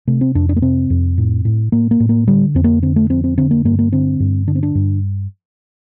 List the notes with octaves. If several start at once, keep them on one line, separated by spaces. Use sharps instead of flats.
C3 A3
C4
F2 D4
D4
A#3
C3 C4
F2
A2
A2
A2 A#3
A#3
A2
A#3
D3 G3
F2 C4
A#3
D3 C4
A3
F2 C4
C4
D3 C4
A#3
G2 A#3
A#3
D3 C4
G2
D3 D4
C4
D4
G2